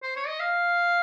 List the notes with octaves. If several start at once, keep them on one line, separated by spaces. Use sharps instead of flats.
C5
C#5
D#5
F5